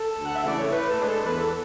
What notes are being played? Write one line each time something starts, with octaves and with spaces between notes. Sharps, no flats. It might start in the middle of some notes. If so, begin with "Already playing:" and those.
Already playing: A4
D2
F#5
E5
C#3 E3 A3 E4 D5
C#5
A2 B4
A4
G#3 D4 B4
A4
E2 B4
A4